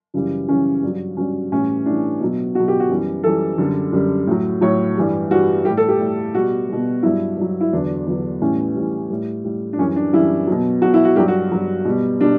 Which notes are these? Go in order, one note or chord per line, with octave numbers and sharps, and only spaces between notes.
F#2 C#3 E3 G3
F#2 C#3 E3 G3 C#4
G2 F#3
G2 F#3 C#4
A2 E3 G3 C#4
A2 E3 G3 D4
B2 F#3
B2 F#3 F#4
G4
F#4
F#2 E3 G3
F#2 E3 G3 A4
F#2 D3 G3
F#2 D3 G3
A2 F#3
A2 F#3 C#5
G2 E3 G3
G2 E3 G3 F#4
A2 G3 G4
A4
G4
A2 G3
B2 G3 F#4
B2 G3
G2 F#3 E4
G2 F#3
E4
E2 D3 F#3 D4
E2 D3 F#3
A2 E3 G3 C#4
A2 E3 G3
A2 G3
A2 G3
D4
F#2 E3 G3 C#4
D4
F#2 E3 G3 E4
B2 F#3
B2 F#3 F#4
E4
F#4
G2 F#3 G4
F#4
G2 F#3
B2 G3
B2 G3 D4